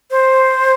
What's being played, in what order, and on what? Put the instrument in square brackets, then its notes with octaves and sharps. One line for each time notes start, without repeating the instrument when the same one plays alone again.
[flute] C5